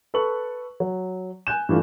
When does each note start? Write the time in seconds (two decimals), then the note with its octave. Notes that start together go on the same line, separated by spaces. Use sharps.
0.14 A4 B4 C#6 F#7
0.80 F#3
1.47 G#5 F#6 G6 E7
1.69 G2 E3 A3 F4